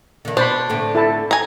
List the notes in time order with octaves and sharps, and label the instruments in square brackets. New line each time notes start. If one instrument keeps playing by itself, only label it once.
[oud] D3 D#3
[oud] B2 [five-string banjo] D4 [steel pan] C5 B5
[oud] A2 D3 C4
[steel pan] E4 A4 A5
[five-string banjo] G#5 A#5